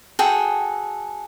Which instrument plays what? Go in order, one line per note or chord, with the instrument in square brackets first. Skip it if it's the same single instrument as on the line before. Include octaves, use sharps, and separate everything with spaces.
[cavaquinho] F#4 G#4 A4 G5